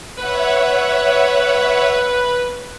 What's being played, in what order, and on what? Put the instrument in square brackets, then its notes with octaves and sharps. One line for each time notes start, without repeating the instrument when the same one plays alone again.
[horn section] B4 [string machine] C#5 E5 F#5